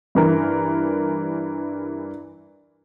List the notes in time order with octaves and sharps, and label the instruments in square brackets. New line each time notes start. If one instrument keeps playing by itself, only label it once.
[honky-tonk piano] G2 E3 A#4